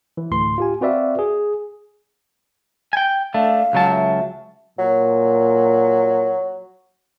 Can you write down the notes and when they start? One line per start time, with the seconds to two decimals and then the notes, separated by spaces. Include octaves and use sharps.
0.17 E3
0.31 D2 A2 C6
0.58 F4 G4 G#5
0.81 C4 F#4 B4 D5 E5 F5
1.19 G#4
2.93 G5 G#5
3.34 A3 D4 F5
3.73 C#2 F#3 A5
3.92 E5
4.79 A#2 F#3